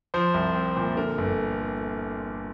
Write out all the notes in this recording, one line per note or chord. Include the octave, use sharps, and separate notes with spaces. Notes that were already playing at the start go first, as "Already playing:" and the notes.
F3 C5
C2
C4
A#2
D3 A#4
G1